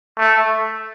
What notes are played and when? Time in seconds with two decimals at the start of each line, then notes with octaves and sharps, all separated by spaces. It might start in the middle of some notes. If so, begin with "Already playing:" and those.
0.18 A3